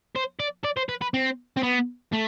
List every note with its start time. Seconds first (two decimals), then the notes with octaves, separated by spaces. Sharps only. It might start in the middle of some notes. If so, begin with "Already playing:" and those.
0.15 C5
0.40 D5
0.65 D5
0.77 C5
0.89 B4
1.02 B4
1.14 C4
1.57 C4
1.63 B3
2.12 A3